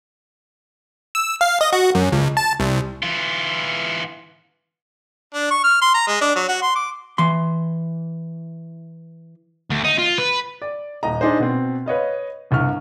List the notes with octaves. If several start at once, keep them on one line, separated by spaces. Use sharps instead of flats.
E6
F5
D#5
F#4
F#2
C#2
A5
C2
E3 F4
D4
C#6
F6
C6
A#5
G#3
D4
F#3
F#4
C6
D6
E3 C6
D2
D#4
F4
B4
D5
D#1 D#5 A#5
D4 D#4 G#4 C5
B2 C4
B4 C#5 D#5 F5
G1 C2 C#6 F6